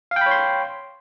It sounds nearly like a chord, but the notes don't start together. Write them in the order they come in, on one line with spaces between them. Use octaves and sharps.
F5 G5 B5 C#5 C6